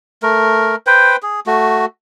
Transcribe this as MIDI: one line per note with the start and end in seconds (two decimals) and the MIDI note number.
0.23 0.76 57
0.23 0.76 70
0.87 1.16 71
0.87 1.16 72
0.87 1.16 79
1.23 1.40 68
1.47 1.86 57
1.47 1.86 66